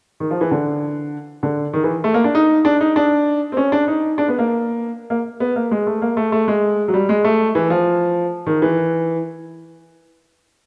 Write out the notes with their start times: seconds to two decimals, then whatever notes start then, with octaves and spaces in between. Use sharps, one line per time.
0.20 D#3
0.31 F3
0.41 E3
0.51 D3
1.43 D3
1.73 D#3
1.84 E3
2.04 A3
2.14 A#3
2.24 D4
2.35 D#4
2.65 D4
2.81 D#4
2.96 D4
3.52 C4
3.57 C#4
3.72 D4
3.88 D#4
4.18 D4
4.28 B3
4.39 A#3
5.10 A#3
5.40 B3
5.56 A#3
5.71 G#3
5.87 A3
6.02 A#3
6.17 A3
6.32 A3
6.48 G#3
6.88 F#3
6.94 G3
7.09 G#3
7.24 A3
7.55 E3
7.70 F3
8.47 D#3
8.62 E3